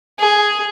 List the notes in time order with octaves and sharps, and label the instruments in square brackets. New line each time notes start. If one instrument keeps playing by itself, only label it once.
[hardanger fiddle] G#4